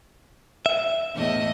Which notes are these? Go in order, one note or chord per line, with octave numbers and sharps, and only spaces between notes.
E5
E2 A2 D#5